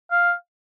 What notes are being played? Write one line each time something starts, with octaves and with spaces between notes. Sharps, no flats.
F5